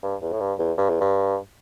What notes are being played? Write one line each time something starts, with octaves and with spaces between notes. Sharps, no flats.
G2
E2
A2
G2
E2
G2
E2
G2